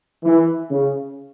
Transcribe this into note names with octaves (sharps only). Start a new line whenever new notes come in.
E3
C#3